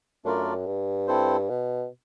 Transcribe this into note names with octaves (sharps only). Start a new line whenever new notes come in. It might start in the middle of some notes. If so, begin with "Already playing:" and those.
F#2 A3 D4 F4 A#4 D5
G2
C4 E4 A4 C5
B2